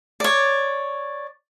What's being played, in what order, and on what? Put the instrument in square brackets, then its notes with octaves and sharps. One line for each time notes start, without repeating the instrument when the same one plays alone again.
[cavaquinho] C#5 D5